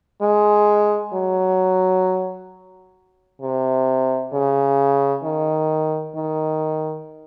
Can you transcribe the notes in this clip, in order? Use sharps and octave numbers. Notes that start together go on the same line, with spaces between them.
G#3
F#3
C3
C#3
D#3
D#3